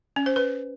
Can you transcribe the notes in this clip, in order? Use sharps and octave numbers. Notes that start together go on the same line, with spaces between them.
C#4
C5
B4